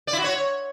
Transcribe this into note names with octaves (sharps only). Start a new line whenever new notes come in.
D5
E4
F#4
C#5